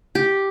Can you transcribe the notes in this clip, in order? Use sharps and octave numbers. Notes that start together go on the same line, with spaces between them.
G4